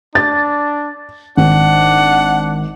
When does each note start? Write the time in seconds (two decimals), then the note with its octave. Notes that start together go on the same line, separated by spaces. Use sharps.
0.15 D4 A6
1.37 G#1 D4 F#5